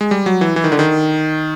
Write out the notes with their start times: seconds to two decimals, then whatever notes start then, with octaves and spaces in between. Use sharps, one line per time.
0.01 G#3
0.11 G3
0.26 F#3
0.41 E3
0.56 E3
0.64 D#3
0.72 D3
0.79 D#3